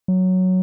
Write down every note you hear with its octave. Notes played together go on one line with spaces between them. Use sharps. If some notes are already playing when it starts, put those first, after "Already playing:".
F#3